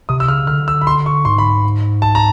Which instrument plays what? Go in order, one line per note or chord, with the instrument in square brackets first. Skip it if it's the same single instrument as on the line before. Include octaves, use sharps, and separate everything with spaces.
[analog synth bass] C3 [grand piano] D#6
[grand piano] E6
[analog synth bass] C#3 [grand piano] F6
[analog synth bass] D3 [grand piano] F6
[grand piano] E6
B5
C6
C#6
[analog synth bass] G#2 [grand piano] C6
[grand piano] B5
A5
A#5